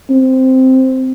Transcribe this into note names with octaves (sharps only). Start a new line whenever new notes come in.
C4